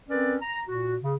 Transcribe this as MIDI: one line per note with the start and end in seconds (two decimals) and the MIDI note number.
0.09 0.35 60
0.09 0.35 61
0.09 0.35 70
0.09 0.35 71
0.09 0.35 74
0.42 0.61 82
0.67 0.96 46
0.67 0.96 66
1.02 1.15 49